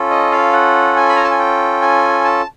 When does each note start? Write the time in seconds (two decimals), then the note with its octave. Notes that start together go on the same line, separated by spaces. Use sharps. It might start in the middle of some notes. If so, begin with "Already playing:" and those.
Already playing: C#4 F4 A4
0.10 D#5
0.31 F5
0.53 F#5
0.96 G#5
1.09 B5
1.16 A#5
1.24 A5
1.31 G#5
1.39 G5
1.82 G#5
2.25 A5